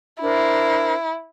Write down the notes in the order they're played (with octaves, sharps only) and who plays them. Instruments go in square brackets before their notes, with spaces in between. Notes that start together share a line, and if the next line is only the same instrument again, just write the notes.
[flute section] D4 A#4 C5 [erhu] E4